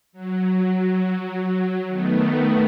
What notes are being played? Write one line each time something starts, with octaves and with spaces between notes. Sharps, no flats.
F#3
D#3 A3 B3